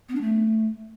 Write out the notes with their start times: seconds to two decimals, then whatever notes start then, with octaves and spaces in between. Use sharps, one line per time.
0.09 B3
0.15 D4
0.22 A3